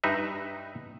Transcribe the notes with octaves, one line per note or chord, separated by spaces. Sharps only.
G2 D#4 B4 E5